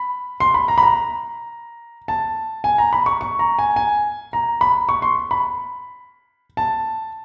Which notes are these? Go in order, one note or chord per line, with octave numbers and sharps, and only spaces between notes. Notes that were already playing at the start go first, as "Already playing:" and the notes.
Already playing: B5
C6
B5
A#5
B5
A#5
A5
G#5
A#5
B5
C#6
C#6
A#5
G#5
G#5
A#5
B5
C#6
C6
B5
A5